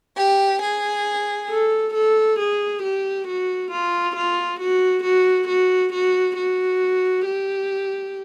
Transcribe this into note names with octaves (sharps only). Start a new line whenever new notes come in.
G4
G#4
A4
A4
G#4
G4
F#4
F4
F4
F#4
F#4
F#4
F#4
F#4
G4